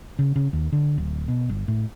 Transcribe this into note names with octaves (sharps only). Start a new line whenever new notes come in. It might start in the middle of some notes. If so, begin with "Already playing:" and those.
C#3
C#3
D#2
D3
D1
B2
G1
A2